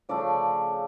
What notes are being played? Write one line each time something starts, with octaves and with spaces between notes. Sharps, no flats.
C#3 F3 A3 D5